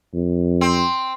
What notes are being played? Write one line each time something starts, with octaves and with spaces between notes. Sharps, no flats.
F2
C4